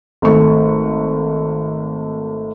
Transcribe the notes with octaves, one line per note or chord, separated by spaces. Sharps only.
G#1 A3 C#6